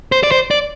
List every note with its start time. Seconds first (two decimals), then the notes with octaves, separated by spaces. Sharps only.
0.12 C5
0.23 D5
0.31 C5
0.51 D5